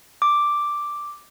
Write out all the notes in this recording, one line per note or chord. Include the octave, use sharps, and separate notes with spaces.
D6